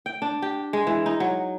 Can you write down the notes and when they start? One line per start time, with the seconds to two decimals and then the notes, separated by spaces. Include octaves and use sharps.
0.06 G5
0.22 D4
0.42 G4
0.73 G#3
0.87 E3
1.06 D#4
1.20 F#3